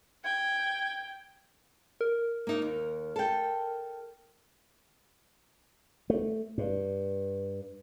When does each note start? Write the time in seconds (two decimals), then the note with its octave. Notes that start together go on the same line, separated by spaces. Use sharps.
0.24 G5 G#6
2.01 A#4
2.47 A#3 D#4
2.62 D#2
3.16 A4 G5
6.10 A3
6.58 G2